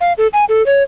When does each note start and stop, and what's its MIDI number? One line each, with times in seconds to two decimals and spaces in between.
0.01 0.13 77
0.18 0.27 69
0.33 0.45 80
0.49 0.65 69
0.66 0.83 73